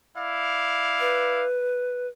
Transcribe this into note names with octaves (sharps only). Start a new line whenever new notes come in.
E4 D5 F5
B4